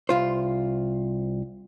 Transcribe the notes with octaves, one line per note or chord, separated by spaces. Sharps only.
C2 F4 C5